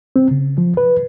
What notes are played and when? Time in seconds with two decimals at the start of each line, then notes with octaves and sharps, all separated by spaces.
0.16 C4
0.31 C#3
0.58 F3
0.77 B4